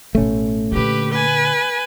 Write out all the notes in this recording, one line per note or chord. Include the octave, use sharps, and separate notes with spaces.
A1 B2 A3 C#4
A#2 D3 G4 B4
B4 G#5